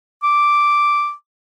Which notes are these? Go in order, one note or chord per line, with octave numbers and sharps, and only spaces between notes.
D6